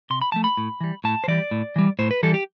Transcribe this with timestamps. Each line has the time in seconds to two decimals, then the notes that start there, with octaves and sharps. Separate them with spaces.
0.10 C3 C6
0.22 B5
0.32 F3 A3 A5
0.44 B5
0.57 A2
0.81 E3 G3
1.04 A2 A5
1.24 C5
1.28 E3 G3 D5
1.51 A2
1.76 E3 G3
1.99 A2 C5
2.11 B4
2.23 E3 G3 A4
2.34 G4